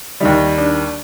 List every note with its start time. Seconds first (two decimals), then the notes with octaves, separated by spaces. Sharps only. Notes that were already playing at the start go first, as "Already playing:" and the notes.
0.20 D#2 D#3 G3 D#4
0.58 D4